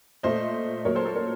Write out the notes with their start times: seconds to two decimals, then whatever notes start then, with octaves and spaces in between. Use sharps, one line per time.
0.23 A#2 A3 C5 D#5
0.85 A#2 F#3 A#3 A#4 C#5
0.95 A4 C5
1.06 A4
1.16 A#4 C#5